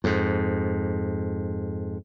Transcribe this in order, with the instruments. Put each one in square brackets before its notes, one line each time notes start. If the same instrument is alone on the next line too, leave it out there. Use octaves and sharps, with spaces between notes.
[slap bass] F2 G#2